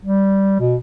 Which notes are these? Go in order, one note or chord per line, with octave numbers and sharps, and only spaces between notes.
G3
B2